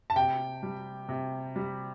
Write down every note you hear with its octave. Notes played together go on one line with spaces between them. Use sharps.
A5
C3 G5
G3
C3
G3